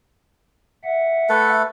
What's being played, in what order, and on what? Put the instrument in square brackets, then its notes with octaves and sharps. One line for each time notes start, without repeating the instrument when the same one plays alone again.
[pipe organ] E5 F#5
[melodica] A3 A4 B4